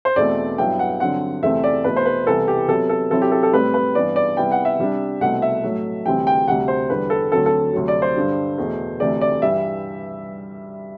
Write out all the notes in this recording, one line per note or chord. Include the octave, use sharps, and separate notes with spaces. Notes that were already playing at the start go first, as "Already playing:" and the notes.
C5
E2 B2 A3 C4 D5
G2 F#3 B3 E4 G5
F#5
G2 D3 F#3 C4 F#5
E2 C3 E3 A3 C4 E5
D5
E2 B2 A3 B4
C5
B4
C2 C3 E3 B3 A4
G4
C3 F#3 B3 A4
A4
C3 F#3 C4 E4 A4
G4
A4
A4
A2 G3 C4 B4
B4
G2 E3 B3 D5
D5
C3 G3 B3 E4 G5
F#5
E5
C3 G3 D4
C2 B2 A3 C4 F#5
E5
A2 F#3 A3
D2 C3 E3 G3 C4 G5
G5
D2 C3 G3 F#5
C5
E2 D3 G3 B4
A4
D2 D3 F#3 C4 A4
A4
D2 C3 F#3
D5
C5
G2 D3 G3 D4
E2 B2 A3
D2 C3 E3 A3 D5
D5
G2 E3 G3 E5